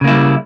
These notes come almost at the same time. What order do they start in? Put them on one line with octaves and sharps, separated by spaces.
C#3 A#3 E4 G3